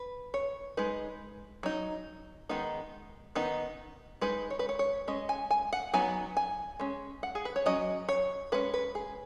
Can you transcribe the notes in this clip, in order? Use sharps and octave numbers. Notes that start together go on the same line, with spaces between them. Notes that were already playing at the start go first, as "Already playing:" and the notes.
Already playing: B4
C#5
G#3 D#4 B4
F#3 D#4
D#3 G#3 B3 D#4
D#3 B3 D#4
G#3 D#4 B4
C#5
B4
C#5
C#5
G#3 C#4 D#5
G#5
G#5
F#5
F#3 B3 D#4 G#5
G#5
G#3 C#4
F#5
G#4
B4
C#5
F#3 C#4 D#5
C#5
G#3 C#4 B4
B4
G#4